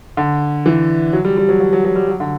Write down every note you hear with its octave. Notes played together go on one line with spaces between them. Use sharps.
D3
E3
F#3
G3
G3
F#3
F#3
F#3
F#3
G3
F#3
D3